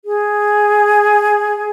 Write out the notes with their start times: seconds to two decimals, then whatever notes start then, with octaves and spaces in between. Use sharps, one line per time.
0.05 G#4